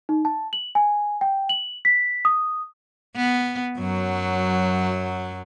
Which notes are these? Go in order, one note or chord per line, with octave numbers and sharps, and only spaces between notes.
D#4
A5
F#7
G#5
G5
F#7
B6
D#6
B3
F#2 F#3